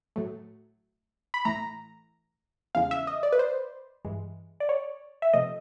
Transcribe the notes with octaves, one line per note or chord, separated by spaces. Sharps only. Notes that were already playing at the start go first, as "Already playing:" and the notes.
A2 F#3 A3
B5
A2 E3 A3 A#5
E2 C#3 E3 G#3 F5
E5
D#5
D5
B4
C5
G2 E3 G#3
D5
C#5
E5
C3 F3 A3 D#5